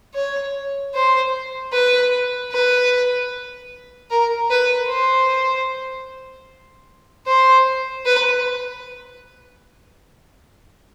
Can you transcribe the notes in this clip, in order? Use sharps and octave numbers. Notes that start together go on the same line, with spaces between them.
C#5
C5
B4
B4
A#4
B4
C5
C5
B4